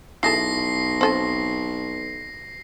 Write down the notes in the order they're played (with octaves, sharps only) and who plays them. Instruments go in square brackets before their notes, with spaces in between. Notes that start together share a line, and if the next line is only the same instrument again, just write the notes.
[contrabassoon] B1 [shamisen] E4 G#4 A4 [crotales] A#6 C7
[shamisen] C4 A4 G#5